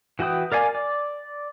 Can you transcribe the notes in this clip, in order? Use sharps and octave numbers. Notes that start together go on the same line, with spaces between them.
E3 F#4 B4 G5 D#6
A#4 D5 F5 G#5
D5